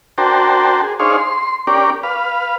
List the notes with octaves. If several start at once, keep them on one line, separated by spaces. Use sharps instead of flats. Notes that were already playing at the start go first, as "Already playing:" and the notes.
D4 F#4 A#4 C5 G5 A5
G#4
D4 D#4 G#4 C5 C#5 F5
C6
C#4 D4 G4 A#4 D5
B4 F5